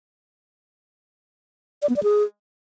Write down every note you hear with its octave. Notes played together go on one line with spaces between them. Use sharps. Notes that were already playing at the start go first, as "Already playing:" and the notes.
D5
B3
D5
G#4